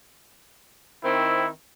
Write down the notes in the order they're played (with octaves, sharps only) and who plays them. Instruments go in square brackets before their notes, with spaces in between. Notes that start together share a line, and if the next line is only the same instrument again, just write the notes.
[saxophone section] D#3 C4 [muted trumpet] E4